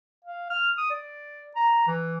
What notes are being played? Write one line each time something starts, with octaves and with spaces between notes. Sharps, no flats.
F5
F6
D#6
D5
A#5
E3